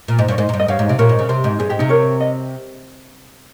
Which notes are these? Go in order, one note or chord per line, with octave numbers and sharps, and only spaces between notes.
A#2
G#2
G2 C#5
G#2 C5 D#5
G#2
G2
D#5
G2 C#5 F5
G#2
C3
A#2 A#4 C#5
G#2
C#3
C3 C5
G#2
G2 G#4
G#2 G4
C3 D#4
A#4 C#5
D#5